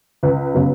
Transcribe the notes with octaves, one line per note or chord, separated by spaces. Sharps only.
C#2 B4
C#3 F#3 B3